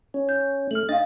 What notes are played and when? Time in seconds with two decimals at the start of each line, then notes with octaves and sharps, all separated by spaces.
0.14 C#4
0.29 G6
0.71 A3 F6 F#7
0.89 D4 D#5 F5 A6